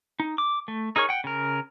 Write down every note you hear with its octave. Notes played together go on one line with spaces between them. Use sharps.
D#4
D6
A3
D#4 G#4 A#4 C#5 C#6
F#5 G5
C#3 A#4